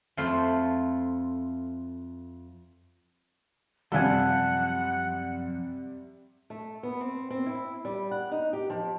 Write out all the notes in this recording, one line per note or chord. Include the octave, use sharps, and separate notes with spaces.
F2 A3 E4 F4 C5 C6
F#2 C3 F3 G3 A4 F5 F#5 G#5
A3
B3
C4
C4
E4
G3
F#5
D#4
G4
F3